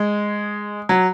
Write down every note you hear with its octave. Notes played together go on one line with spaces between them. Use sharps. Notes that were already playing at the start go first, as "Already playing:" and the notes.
Already playing: G#3
F#3